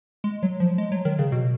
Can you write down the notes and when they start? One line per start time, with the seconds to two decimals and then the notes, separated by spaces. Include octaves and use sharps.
0.24 G#3
0.43 F#3
0.60 F3
0.78 G#3
0.92 F#3
1.05 D#3
1.19 C#3
1.32 B2